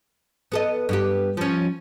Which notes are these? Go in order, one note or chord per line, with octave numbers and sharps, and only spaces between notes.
B3 A4 D#5
G2 B3 G4
F3 C#4